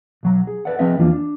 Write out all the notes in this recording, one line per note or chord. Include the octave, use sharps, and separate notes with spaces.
B1 F#3 A#5
G#4
A4 B4 D5 E5 F#5
F3 C4 G#4 B4 D#5 E5
E2 E3 F3 A#3 D4 F4
D4